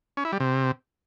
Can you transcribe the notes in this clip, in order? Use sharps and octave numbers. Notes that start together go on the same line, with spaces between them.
C#4
E4
G3
C3